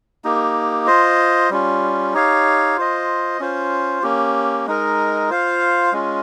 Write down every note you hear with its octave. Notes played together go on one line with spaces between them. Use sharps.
A#3 D#4 G4
F4 C5 D#5
G3 C#4 F4
D#4 G4 C#5 F5
F4 C5 D#5
C#4 F4 C5
A#3 C#4 G4
G#3 D#4 A#4
F4 C5 F5
G#3 C#4 F4